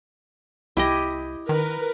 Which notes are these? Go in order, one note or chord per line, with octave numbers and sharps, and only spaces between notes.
C2 E4 G4 D#5
D#3 A#4 B4